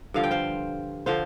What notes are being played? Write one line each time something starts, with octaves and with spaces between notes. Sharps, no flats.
G2 D3 F3 F5
G5
C5 F5
D3 F3 C5 F5